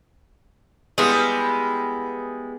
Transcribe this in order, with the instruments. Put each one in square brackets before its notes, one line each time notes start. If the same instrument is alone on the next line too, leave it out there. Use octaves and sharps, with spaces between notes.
[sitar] G3 G#3 E4 [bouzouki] B3 G#4